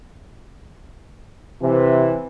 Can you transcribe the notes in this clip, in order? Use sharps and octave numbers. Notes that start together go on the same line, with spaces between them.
C3 E3